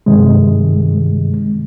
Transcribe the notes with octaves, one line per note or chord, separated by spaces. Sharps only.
G2 C3 D#3 G#3